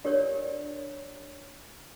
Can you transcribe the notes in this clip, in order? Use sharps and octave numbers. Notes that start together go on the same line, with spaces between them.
D4 G4 A#4 C#5 D5